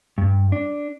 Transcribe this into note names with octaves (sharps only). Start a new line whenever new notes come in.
G2
D4